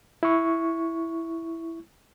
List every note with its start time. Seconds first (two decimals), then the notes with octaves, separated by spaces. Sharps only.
0.23 E4 C#6